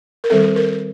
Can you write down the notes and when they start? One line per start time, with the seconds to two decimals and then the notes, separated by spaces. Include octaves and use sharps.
0.24 A#4
0.30 D#3 G3 C4 A4
0.56 A#4